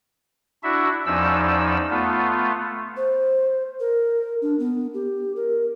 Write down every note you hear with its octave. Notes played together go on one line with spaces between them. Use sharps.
D4 E4 F#4 E5
E2 F3 C#4 D#4 D5 E6
A3 B3 F4
C5
A#4
D4
B3
G4
A#4